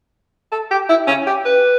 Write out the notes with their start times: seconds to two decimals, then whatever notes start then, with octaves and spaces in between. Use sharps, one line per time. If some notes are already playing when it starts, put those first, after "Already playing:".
0.52 A4
0.71 G4
0.89 E4
1.07 C#4
1.27 G4
1.45 B4